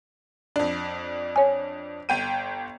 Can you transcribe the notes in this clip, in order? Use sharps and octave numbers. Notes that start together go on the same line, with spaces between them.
F2 D4
C#5 G#5
G1 G5 D#7